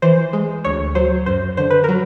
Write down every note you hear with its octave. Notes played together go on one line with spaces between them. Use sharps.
E3 C5
G#3
D2 C#5
F#3 C5
F#2 C5
D3 C5
B4
F#3 A#4